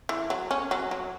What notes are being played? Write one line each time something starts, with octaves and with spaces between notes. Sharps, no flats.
E3
F#3
C#4
F#3
F#3